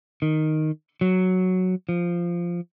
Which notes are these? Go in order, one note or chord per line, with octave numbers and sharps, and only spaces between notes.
D#3
F#3
F3